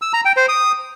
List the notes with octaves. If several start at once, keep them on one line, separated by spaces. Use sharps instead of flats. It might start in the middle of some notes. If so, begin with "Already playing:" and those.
E6
A#5
G5
C5
D#6